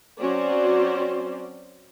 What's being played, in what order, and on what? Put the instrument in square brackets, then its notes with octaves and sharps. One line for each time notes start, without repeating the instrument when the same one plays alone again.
[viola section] F#3 C4 C#4 F#4 C5 D5